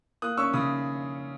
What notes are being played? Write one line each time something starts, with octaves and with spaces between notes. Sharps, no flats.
A#3 D#6 F#6
C#4 C#6 E6
C#3 B5 D#6